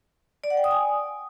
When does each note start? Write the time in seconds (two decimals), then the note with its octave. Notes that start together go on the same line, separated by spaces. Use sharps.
0.44 D5
0.50 F#5
0.57 G5
0.64 D#6
0.71 G#5